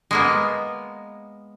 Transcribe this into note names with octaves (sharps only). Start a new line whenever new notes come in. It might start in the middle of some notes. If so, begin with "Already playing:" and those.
G#3 A#3 B3